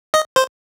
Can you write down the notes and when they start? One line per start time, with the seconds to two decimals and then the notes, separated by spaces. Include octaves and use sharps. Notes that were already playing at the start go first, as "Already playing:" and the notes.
0.14 D#5
0.36 C5